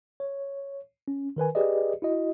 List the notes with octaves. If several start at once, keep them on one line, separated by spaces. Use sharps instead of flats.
C#5
C#4
D#3 A#4 B4 G#5
G4 G#4 B4 D5 D#5
E4 F#4 D#5